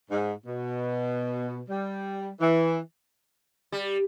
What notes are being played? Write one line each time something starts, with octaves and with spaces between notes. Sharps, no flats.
G#2
B2
G3
E3
G3